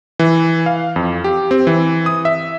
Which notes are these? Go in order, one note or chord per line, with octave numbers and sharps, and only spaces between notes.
E3
F5
F2
G4
C4
E3
D#6
E5